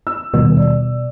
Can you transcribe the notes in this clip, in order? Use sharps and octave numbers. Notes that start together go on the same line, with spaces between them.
E6
D#1 B2
D5